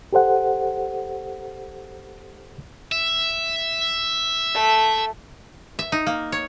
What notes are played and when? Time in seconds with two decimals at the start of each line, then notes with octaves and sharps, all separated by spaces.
0.13 G4 A4 C5 F#5
2.92 E5
4.54 A3
5.79 E5
5.92 D#4
6.07 A#3
6.32 C#5